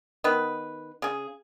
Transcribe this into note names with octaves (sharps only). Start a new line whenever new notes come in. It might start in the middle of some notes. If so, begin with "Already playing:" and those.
D#3 B3 B4
C#3 G#4